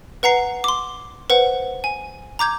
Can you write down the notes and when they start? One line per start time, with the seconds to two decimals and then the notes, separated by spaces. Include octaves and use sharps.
0.23 B4 F#5 A#5 C7
0.64 C6 D6
1.30 B4 C5 F#5
1.84 G#5
2.39 A#5 D6 G6 G#6